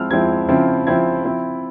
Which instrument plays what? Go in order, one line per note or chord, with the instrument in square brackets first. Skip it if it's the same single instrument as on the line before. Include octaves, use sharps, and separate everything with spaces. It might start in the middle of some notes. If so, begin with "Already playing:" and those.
Already playing: [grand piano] F3 G#3 C4 E4 E6 F6
F3 G#3 C4 E4 G#6
C#3 F3 C4 E4
C#3 F3 C4 E4 G#6
F3 C4 E4